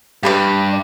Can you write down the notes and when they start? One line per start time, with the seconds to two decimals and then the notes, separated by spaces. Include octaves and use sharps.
0.23 G2 G4 B4 D5